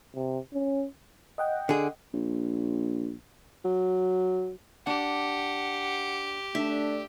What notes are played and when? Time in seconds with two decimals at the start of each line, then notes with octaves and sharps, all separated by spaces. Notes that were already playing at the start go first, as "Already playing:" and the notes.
0.15 C3
0.53 C#4
1.38 D#5 F#5 G5
1.69 D3 G#4
2.14 A#1
3.65 F#3
4.87 D4 G4 F#5
6.55 A3 D4 E5